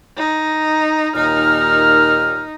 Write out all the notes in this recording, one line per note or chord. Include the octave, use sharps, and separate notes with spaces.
D#4
D#2 A#2 D#4 F6